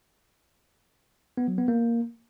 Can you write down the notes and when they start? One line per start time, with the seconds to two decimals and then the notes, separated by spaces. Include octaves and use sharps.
1.37 B3
1.48 F#3
1.58 B3
1.68 A#3